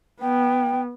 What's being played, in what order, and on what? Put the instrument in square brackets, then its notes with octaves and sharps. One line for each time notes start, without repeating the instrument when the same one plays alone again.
[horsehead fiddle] B3 [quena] G5